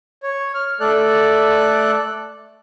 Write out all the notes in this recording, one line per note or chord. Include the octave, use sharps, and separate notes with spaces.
C#5
F6
A3 A4 D5 F#6